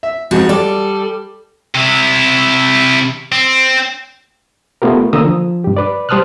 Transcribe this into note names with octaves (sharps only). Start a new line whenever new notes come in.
E5
F2 G#2 F#4
G3 A4 D5
C3 E4
C4
A3 B3 F4 G4 A#4
D3 A#3 A#5 D#6 E6
F3
G2 G4
B4 D5
G3 C5 A5 D#6 F6 F#6